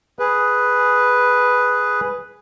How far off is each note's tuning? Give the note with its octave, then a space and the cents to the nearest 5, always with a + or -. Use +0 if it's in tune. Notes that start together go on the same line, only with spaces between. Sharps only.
G#4 +0 B4 +0